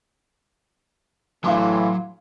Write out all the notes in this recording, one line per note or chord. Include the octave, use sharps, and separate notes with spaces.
A2 E3 F#3 F5 C6 D6